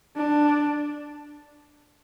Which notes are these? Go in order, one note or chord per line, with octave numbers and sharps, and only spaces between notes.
D4